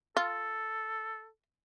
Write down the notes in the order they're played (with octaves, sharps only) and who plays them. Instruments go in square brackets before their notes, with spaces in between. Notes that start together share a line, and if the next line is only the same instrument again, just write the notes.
[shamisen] F4 [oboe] A4